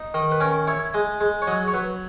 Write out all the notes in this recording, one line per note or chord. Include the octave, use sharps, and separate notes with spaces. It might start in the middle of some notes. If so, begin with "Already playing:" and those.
Already playing: D#4
D#3 D#5
B4
C#4 A#4
E4 C#5
G#3 D#5
G#3
C#5
F#3 D#5
C#5
F#3 B4